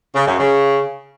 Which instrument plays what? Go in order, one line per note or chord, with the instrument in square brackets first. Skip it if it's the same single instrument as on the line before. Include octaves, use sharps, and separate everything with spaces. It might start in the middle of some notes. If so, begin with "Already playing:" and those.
[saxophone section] C#3
F#2
C#3